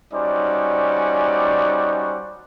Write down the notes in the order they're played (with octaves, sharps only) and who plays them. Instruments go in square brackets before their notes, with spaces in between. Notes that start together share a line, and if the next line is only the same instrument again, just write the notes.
[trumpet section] G3 C#4 D#4 F#4 C5 D5